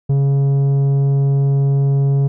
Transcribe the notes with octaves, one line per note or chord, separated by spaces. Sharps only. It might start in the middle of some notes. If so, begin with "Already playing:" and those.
C#3